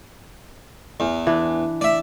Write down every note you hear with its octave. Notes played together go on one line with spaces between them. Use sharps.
E2
E3 D4
D5 E5